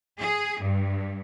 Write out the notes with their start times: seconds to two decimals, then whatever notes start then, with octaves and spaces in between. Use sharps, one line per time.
0.19 G#4
0.60 G2